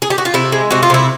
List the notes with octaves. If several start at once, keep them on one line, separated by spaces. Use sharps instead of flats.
G#4
G4
F#4
F4
C3 E4
G#3
C3 F#4
F4
C3 E4